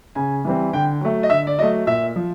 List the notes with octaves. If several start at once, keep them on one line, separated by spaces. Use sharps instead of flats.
C#3 G#5
E3 G3 C4
D3 G5
F#3 A3
D#5
D3 E5
D5
F#3 A3 D#5
A#2 E5
F3